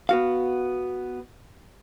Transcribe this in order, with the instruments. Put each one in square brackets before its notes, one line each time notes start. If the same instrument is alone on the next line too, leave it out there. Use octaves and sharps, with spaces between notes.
[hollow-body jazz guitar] B3 F#4 F5